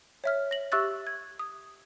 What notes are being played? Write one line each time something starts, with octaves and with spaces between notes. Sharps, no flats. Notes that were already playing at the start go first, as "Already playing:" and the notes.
C#5 E5 F6
A#6 F#7
G4 E5 C#6 E6 F#6 A6
G#6
D#6